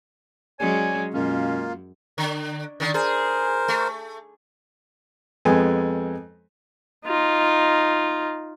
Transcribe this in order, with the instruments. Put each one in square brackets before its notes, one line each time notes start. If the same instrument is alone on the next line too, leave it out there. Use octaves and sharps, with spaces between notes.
[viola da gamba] F#3 G#3 C#4 [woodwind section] C#5 D5 G#5
[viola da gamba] F#2 [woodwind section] B2 G#3 C#4 [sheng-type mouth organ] A#3 F4
[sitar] D3
D3 D#3
[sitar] G#4 [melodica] A#4 C5
[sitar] A3
[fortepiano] F2 G#3 B3 G#5
[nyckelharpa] D#4 F4